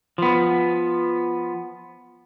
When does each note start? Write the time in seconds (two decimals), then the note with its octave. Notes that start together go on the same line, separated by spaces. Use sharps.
0.18 F3 B3